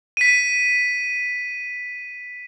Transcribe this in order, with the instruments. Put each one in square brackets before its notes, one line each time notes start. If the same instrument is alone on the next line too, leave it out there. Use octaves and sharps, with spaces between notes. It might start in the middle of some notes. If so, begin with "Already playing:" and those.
[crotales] B6 D#7